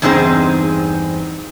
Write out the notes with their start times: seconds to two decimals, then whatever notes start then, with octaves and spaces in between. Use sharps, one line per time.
0.02 E2 G2 C4 D#4 G#4 C5